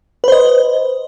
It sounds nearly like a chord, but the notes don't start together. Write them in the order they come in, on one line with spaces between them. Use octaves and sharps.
B4 C5 D#5